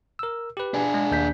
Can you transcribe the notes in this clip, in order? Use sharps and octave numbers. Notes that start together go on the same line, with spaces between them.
A#4 E6
G4 B4
D4 G#4
G#3
D#2 G6 B6